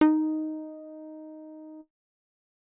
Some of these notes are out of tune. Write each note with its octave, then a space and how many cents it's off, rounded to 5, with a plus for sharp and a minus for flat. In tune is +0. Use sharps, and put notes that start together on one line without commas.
D#4 +0